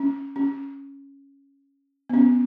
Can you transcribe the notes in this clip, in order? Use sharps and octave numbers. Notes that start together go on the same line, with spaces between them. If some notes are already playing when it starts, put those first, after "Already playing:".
Already playing: C#4
C#4
B3
C#4